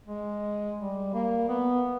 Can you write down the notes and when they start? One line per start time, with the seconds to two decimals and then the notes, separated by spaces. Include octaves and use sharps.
0.07 G#3
0.78 G3
1.13 A#3
1.49 B3